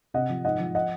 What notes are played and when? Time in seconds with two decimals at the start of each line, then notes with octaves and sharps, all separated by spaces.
0.14 C3 D#5 F#5
0.30 F3
0.45 G#2 D#5 F#5
0.60 F3
0.75 D#5 F#5